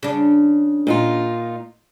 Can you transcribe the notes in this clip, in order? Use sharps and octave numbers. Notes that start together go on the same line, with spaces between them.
C#3 D4
A#2 D#4 F4